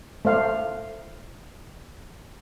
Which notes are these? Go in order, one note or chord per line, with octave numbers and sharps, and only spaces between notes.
A3 C5 F5